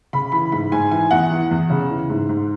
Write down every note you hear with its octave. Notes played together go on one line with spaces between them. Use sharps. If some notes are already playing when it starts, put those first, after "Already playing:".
C#3 B5
E3 B5
G#2 B5
G#2 G#5
E3 G#5
E2 F#5
E3
E2
C#3
E3
G#2
G#2